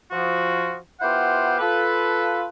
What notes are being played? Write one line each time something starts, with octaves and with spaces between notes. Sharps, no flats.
F3 F#4
B3 E4 F4 G4 C5 F#5
F4 A4 B4